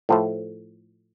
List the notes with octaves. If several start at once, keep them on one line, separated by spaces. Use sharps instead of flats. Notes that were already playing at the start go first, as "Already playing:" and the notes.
A2 F3 A3